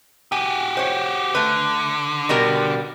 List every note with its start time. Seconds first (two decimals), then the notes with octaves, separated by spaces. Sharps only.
0.32 F#4 G4 G#5
0.77 C5 C#5
1.35 D3 A3 B4
2.29 B2 G3 A#4